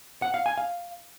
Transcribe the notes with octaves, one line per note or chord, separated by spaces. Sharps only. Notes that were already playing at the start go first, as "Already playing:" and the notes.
F#5
F5
G#5
F5